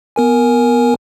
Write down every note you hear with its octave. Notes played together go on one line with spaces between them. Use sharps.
B3 A#4 G#5